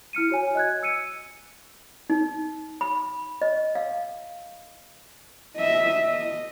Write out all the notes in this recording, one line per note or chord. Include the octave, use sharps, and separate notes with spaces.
E4 F6 C#7 D#7
F#4 C#5 G#5
D#5 F#6 G#6
E6 C#7 D#7
D#4
B5
D#5
F5
D#5 E5
D#5